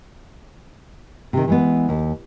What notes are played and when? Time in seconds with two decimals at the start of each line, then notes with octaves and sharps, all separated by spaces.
1.33 C3 D#3
1.48 E3 G#3 B3
1.89 D#2